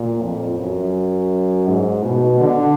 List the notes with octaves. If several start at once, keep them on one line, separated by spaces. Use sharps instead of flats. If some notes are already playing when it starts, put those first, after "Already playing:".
Already playing: A#2
F2
F#2
G#2
B2
D3